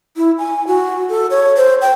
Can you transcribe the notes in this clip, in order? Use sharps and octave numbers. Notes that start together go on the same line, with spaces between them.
E4
G#5
F#4
A4
C#5
C5
G5